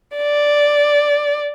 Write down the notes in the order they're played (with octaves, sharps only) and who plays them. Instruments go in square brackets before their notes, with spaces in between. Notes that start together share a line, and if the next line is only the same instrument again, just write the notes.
[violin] D5